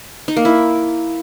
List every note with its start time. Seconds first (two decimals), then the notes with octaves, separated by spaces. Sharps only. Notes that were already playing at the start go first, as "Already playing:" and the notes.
0.28 D#4
0.37 A#3
0.45 E4